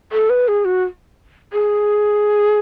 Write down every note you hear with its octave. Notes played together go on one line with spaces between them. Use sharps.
A4
B4
G#4
F#4
G#4